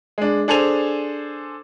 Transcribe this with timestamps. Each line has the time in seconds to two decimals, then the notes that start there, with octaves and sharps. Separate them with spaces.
0.18 G#3 D4
0.48 D4 G#4 A4 C5 G#5 F7